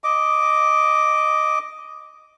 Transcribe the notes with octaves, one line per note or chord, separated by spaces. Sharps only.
D#5 D6